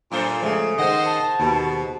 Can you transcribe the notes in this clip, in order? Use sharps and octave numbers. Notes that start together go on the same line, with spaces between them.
F#2 A#2 A4 C5
C#3 F3 G#3 A3 G#4
G#2 D#3 C5 D#5 F#5
A5
D#2 B2